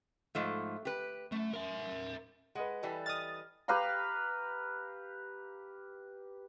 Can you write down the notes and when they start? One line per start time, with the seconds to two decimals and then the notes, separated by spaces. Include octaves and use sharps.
0.35 G#2 F3 A3
0.85 G4 B4
1.32 F#2 A3
1.54 A#4 E5
2.55 G#3 B4 D#5 F#5
2.83 E3 G3 A4
3.06 D#5 D#6 F6 A6
3.68 G4 B4 F5 A#5